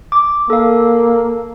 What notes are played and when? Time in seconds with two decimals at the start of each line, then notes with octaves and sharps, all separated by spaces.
0.12 D6
0.50 A#3 A4 F5